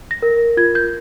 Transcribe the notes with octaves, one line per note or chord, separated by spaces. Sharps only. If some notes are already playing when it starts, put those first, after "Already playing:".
A#6
A#4
F4 G#6
G6